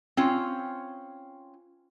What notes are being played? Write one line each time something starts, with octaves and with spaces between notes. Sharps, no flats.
C4 C#4 F4